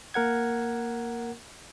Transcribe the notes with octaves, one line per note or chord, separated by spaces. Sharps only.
A#3 A#4 F#5 G#6